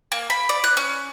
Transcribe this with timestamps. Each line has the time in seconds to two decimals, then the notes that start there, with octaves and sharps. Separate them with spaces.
0.12 A#3
0.30 B5
0.49 D5
0.64 F#6
0.77 C#4